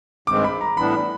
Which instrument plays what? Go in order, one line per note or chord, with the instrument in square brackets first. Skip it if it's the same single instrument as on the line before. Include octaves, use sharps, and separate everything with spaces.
[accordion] G2 D#3 G#3 C4 [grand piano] D6
[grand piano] B5
A#5
[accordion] A2 E3 G3 B3 D4 [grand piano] B5